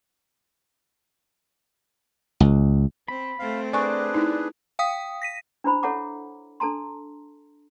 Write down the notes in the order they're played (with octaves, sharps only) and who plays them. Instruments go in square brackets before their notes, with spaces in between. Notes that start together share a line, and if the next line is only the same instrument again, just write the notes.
[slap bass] C#2
[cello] C4 [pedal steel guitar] B5
[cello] A3 C4 [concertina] F5
[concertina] D4 G#4 B4 [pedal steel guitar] D5 [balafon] G#5 C#6
[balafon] D#4 E4
[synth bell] F5 G5 D#6 B6
A#6 B6 D#7
[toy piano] D4 E4 C5 B5
A4 C#5 E5 F#5 A#5 D6
D4 A4 A5 A#5 C6